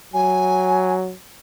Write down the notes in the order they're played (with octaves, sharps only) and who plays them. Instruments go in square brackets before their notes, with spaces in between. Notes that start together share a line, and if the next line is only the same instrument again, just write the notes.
[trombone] F#3 [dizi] G#5